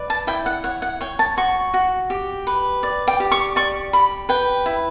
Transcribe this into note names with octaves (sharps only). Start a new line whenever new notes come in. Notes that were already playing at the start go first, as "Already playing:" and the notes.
Already playing: B4 D5
A5
E4 G5
F#5
C#5 F#5
F#5
C#5 G5
A5
F#4 C#6
F#4
G4
B4
D5
G5
G4
C#6
D5 C#6
G4 B5
B4 G5
E4